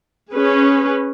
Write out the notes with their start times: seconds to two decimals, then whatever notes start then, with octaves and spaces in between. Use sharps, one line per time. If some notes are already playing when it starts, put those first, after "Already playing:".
0.33 C#4 G#4 B4